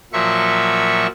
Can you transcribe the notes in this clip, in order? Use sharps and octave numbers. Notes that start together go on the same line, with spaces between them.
A#2 F3 F#3 E5 C#6